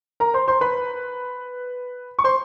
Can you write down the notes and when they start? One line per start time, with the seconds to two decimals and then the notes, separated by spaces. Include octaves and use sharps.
0.20 A#4 A#5
0.34 C5 C6
0.48 C5 C6
0.61 B4 B5
2.19 C#6
2.24 C5 C6